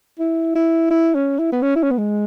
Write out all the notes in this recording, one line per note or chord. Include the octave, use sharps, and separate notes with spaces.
E4
E4
E4
C#4
E4
B3
C#4
E4
C#4
B3
G#3